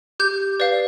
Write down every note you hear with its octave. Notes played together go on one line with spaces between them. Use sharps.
G4 G6
B4 D5 F5